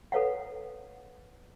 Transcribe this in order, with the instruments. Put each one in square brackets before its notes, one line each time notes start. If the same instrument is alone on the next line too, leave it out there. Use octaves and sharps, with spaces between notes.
[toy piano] A4 B4 C#5 F5 F#5